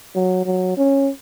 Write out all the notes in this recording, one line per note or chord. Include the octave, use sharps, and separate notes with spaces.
F#3
F#3
C#4